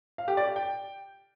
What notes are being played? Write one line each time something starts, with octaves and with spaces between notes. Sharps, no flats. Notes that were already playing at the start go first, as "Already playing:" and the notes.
F5
G4
D5
G4
G5